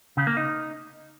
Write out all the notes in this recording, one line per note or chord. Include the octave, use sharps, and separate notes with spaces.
C#3
A#3
D#4